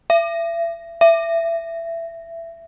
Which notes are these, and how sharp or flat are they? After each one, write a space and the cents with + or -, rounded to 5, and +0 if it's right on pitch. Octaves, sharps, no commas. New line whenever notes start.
E5 +35
E5 +20